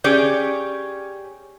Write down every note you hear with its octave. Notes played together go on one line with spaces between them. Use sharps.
C#4 G4 G#4 D5